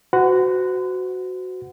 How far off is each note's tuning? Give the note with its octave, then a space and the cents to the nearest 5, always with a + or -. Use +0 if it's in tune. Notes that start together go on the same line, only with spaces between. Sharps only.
F#4 +0 C5 -45 F#5 +0